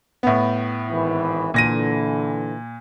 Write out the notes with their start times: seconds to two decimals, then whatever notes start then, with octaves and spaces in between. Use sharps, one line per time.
0.23 A2 B3
0.90 G#1 E3
1.54 A#2 D3 E3 A#6 D#7